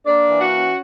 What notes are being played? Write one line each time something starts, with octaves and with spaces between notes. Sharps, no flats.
A#3 D4 D5
E3
F#4 F#5
C#4